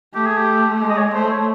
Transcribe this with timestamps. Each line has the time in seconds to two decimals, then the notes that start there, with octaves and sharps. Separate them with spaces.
0.14 A3 G4
0.27 G#4
0.38 G4
0.82 G#3
0.90 D#5
0.98 C#5
1.14 A3 C5
1.31 C#5